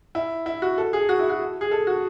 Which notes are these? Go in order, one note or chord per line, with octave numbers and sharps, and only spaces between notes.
E4
E4
F#4
A4
G#4
F#4
E4
F#4
G#4
A4
F#4